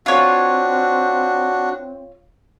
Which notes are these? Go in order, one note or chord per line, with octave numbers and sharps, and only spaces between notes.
C4 D4 F4 F#4 C#5